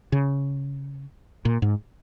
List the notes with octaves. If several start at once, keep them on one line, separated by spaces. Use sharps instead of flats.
C#3
A#2
G#2